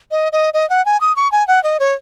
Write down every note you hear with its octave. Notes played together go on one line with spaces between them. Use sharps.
D#5
D#5
D#5
F#5
G#5
D#6
C#6
G#5
F#5
D#5
C#5